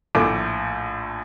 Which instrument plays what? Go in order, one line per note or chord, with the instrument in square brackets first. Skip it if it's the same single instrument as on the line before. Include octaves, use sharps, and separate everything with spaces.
[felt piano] A#1 A2 A3 D6